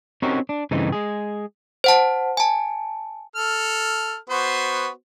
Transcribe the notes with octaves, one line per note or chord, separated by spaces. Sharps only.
C4 C#4 D#4 F#4 G4 A#4
D4
G2 C#3 E3 A3 C4 D#4
G#3 G#4
C5 F#5 A5
G#5 A5
A4 F6
B3 F#4 C5